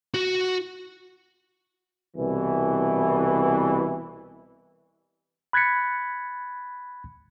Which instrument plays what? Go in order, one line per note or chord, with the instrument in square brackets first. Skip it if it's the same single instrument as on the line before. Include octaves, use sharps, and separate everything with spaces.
[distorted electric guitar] F#4 F#5
[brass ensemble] C2 B2 E3
[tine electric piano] B5 F#6 G#6 A6 B6 C#7